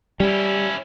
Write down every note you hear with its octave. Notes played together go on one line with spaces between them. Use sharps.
G3 C#4 E4